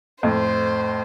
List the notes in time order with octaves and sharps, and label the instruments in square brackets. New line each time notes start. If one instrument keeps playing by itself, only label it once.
[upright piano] F2 A2 [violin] C5